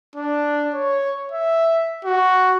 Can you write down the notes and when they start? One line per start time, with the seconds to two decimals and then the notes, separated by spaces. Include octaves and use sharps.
0.16 D4
0.74 C#5
1.32 E5
2.05 F#4